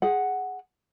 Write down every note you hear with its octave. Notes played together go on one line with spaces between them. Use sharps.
G#4 F#5